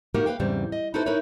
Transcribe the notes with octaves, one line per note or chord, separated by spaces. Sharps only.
A#3 D#4 F#4 G4 A#4
B4 C5 F5 G5
E2 G#2 C#3 G3 C4
D#5
D#4 E4 F#4 A4 B4 C5
D#4 E4 A#4 B4 C#5